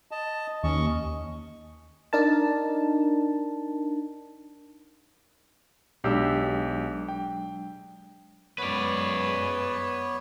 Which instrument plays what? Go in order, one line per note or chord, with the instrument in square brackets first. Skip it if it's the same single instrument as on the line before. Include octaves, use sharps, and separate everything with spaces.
[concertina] D#5 A5
[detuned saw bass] D#2 [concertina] C#4 D#5 C#6
[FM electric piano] D4 D#4 A#4 A5
[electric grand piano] B1 G4 E6 [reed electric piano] F#3 G#3 D4
[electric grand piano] G5
[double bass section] F#2 G#3 [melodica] B3 C#5 [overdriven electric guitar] B4 D5